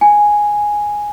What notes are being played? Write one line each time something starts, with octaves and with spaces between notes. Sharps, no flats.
G#5